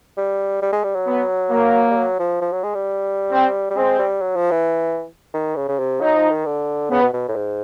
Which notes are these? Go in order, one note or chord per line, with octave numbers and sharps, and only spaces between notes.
G3
G3
G#3
G3
F#3
B3
A#3
G3
F#3
F3
F3
F#3
G#3
G3
C4
G3
G#3 C4
G3
F#3
F3
E3
D#3
C#3
C#3
C3
F#3 D#4
F3
D#3
D3
C#3 B3
B2
B2
A2
G#2